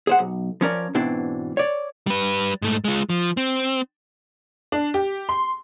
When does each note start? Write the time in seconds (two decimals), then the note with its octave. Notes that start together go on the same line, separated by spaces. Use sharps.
0.07 G#4 C5 F#5
0.19 B1
0.61 F3 C#4 A#4 D5
0.95 G#2 B2 E3 C4 D4
1.57 C#5 D5
2.07 G3 B4
2.62 G#2 A3
2.85 G#3 F4
3.10 F3
3.37 C4
4.72 D4
4.94 G4
5.29 C6